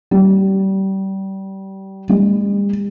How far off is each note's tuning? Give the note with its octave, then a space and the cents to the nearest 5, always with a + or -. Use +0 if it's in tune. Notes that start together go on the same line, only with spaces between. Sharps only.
G3 -25
G3 +45